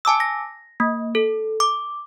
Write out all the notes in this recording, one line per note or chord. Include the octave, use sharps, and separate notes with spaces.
G#5 A5 D6 E6
A#6
A#3
A4
D6